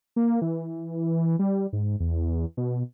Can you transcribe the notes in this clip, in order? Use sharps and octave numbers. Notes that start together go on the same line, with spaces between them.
A#3
E3
G3
G#2
E2
B2